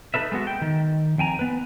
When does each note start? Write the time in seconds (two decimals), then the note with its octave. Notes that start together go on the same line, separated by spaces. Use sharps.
0.14 D#4 E4 A4 B4 E5
0.32 G#3 B3 F#4
0.47 G5
0.62 D#3
1.18 F2 G5 G#5 A#5
1.39 B3 B4